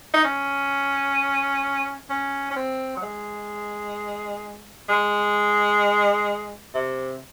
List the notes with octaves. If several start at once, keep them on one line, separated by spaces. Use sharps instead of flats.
D#4
C#4
C#4
C#4
C4
F#3
G#3
G#3
C3